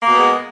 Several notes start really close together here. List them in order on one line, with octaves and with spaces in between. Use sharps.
A#3 B2 B3 G#3